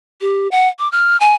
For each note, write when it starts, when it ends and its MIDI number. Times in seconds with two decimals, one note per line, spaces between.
0.21 0.48 67
0.51 0.68 78
0.79 0.90 86
0.92 1.18 89
1.20 1.35 80